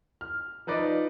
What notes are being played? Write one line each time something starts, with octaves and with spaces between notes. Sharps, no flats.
F6
F3 D#4 B4 D5 D#5